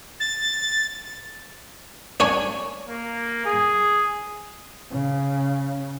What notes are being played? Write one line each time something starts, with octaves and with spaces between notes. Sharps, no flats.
A6
D4 C#5 G#5
A#3
G#4
C#3